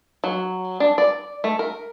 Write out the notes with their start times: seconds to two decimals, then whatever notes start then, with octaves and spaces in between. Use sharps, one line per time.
0.24 F#3
0.80 D4
0.98 D5
1.44 A3
1.59 A#4